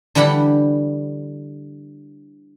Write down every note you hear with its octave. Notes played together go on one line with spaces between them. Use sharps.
D3 E3 G3 G4 F#5 B5